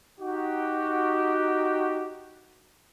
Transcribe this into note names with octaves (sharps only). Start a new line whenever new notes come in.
D#4 F#4 G4